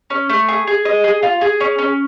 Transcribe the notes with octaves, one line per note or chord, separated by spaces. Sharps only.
C#4
A3
G#4
G#4
D#5
G#4
F4
G#4
C#4
C#4